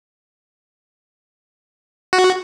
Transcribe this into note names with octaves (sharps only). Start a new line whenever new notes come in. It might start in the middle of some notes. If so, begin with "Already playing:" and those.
F#4